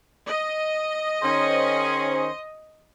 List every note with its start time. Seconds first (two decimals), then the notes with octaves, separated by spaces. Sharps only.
0.27 D#5
1.21 D#3 C#4 G#4 C5